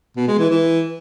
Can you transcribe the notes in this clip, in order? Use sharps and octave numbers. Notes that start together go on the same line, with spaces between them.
B2
G#3
E3
E3